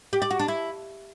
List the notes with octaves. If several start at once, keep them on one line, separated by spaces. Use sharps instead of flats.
G4
D5
F#4
D4
E4